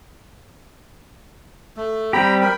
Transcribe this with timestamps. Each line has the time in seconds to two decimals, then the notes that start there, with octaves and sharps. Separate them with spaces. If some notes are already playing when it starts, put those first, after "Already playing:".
1.77 A3
2.13 G3 C4 G4 G5 A#5 B5
2.41 A#4 G5 B5